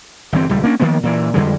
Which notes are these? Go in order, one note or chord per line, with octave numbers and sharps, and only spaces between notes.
G1 E3 C4
D#1 C#2 G3
A#3 C#4 D4
D#3 F3 A#3 B3
A#2 E3
F2 D3 G3 G#3